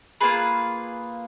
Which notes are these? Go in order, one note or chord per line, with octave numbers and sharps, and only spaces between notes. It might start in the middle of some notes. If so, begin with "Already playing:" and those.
A#3 C#4 F4 G#4 B4